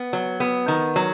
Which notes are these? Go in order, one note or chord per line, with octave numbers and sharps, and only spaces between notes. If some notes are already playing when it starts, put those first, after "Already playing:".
Already playing: B3
F#3
B3
D#3
F#3